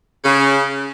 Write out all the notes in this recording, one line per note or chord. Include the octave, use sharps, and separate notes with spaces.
C#3